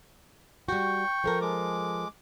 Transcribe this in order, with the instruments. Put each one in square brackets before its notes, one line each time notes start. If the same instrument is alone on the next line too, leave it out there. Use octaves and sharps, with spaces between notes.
[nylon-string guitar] G3 F#4 [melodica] G5 C#6
[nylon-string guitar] F3 A4 A#4
[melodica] G#3 D6